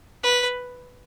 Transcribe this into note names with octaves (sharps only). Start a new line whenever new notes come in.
B4